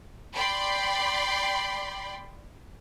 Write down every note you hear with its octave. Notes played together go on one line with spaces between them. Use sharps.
D5 G5 B5 C6